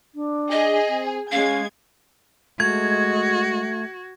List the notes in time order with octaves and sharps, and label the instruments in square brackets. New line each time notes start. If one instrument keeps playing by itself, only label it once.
[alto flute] D4
[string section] G#4 [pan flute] D#5
[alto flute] C4
[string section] G#3 G#6 [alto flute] C#4 [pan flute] F5
[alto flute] G#3 [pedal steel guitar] A3 [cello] F#4 [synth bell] G#6